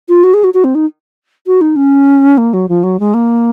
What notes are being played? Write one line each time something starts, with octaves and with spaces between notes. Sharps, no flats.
F4
F#4
G#4
F#4
F#4
C4
D#4
F#4
D#4
C#4
A#3
F#3
F3
F#3
G#3
A#3